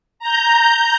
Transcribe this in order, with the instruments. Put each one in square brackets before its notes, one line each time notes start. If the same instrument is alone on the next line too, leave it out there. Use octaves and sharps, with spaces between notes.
[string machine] A#5 G6